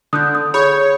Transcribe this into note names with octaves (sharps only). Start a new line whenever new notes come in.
D3 D#6 F#6 G6
D#6
G#4 C#5 B5 G6